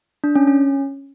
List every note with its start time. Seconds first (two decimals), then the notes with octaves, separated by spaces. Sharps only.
0.24 D4
0.36 C#4
0.47 C#4